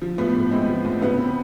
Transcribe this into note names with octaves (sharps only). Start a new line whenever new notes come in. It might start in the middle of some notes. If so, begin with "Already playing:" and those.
F3
A2 B3
A2
G#3 C4
F3
A2
C#3 B3
C4